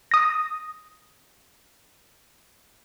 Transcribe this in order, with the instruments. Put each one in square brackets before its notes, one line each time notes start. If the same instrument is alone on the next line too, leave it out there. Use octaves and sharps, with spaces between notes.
[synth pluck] D#6 A#6